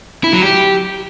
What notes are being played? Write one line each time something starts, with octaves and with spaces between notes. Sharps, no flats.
E4
F#3
G4